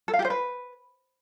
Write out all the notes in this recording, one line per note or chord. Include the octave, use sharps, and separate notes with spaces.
A4
F5
G4
C5
B4